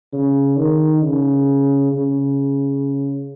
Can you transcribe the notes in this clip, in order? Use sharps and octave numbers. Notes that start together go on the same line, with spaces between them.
C#3
D#3
C#3
C#3